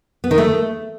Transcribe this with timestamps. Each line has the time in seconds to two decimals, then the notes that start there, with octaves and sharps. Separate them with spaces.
0.24 B3
0.31 D#3
0.38 A3